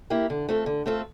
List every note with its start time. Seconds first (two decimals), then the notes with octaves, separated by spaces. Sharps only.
0.10 A#3 E4 G4
0.30 D3
0.49 A3 C4 F4 A4
0.66 D3
0.86 A3 C4 F4 A4